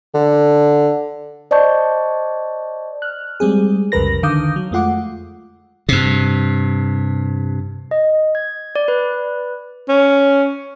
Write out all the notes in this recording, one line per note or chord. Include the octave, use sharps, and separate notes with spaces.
D3
C5 D5 D#5 A5 C#6 G6
F6 F#6
G3 G#3 C4 G#4
C2 F2 C#3 A#4 B4 A#6
D3 D#3 F5 D6 D#6 G6
F#3
F2 G#3 A3 F4 F#5 D6
G2 C3
D#5
G#6
D5
B4
C#4